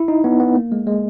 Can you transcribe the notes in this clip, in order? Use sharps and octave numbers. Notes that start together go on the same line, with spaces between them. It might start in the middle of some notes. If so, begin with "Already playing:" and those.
Already playing: E4
D#4
B3
B3
A#3
G#3
G#3